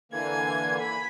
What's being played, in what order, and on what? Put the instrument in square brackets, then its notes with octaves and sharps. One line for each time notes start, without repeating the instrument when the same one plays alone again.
[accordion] D3 E3 A#3 [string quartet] G#5 G#6
[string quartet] B5